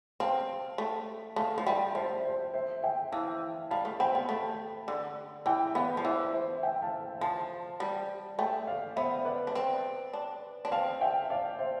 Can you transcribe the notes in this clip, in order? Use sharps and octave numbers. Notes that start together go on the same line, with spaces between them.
C4 F5 A5
A3
A3 F5 A5
F3
G3 E5 G5
F3 C5 E5
C5
C5 E5
E5 G5
E3 F5 A5
G3 F5 A5
A3
C4 G5 B5
B3
A3
D3
E3 E5 G5
B3 D5 F5
F3
E3 C5 E5
C5 E5
E5 G5
F5 A5
F3 F5 A5
G3
A3 E5 G5
D5 F5
B3 C5 E5
B4 D5
D4
C4
D4
D4
C4 F5 A5
E5 G5
D5 F5
C5 E5